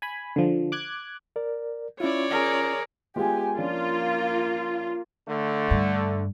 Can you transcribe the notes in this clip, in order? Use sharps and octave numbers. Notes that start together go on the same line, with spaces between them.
G#5 B5
D3 F3
D6 F#6 G#6
A#4 D5
C#4 E4 F4 C#5 D5
G#4 A#4
G#3 B3 F4 G4 G#5
F3 A#3 C#4 D4 F4
D3 A3
G2